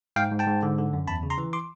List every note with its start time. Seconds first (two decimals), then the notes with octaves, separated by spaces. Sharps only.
0.16 G#2 F5 G5
0.32 G#2
0.39 G5 A5
0.47 G#2
0.63 D3
0.78 D3
0.93 F#2
1.07 E2 A5 B5
1.23 C#3
1.30 A#5 C6
1.38 E3
1.53 C6 D6